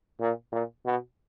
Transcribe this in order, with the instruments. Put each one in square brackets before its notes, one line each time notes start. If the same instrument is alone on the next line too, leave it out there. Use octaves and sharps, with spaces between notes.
[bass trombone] A#2
A#2
B2